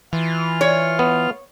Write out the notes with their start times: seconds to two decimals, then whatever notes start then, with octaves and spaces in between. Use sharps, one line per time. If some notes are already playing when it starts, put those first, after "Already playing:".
0.13 E3 F4 F6
0.61 C#5
0.99 B3